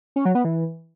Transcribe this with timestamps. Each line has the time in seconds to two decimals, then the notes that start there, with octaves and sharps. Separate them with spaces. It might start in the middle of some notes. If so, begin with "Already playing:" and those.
0.16 C#4
0.25 F#3
0.35 B3
0.45 E3